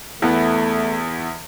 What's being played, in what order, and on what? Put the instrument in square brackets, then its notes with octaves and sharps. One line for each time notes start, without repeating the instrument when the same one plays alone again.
[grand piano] E2 E3 B3 [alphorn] A3